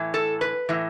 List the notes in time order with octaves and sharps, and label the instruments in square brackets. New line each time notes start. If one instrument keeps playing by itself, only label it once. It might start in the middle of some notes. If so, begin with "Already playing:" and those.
Already playing: [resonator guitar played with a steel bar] A2 E3
A4
B4
A2 E3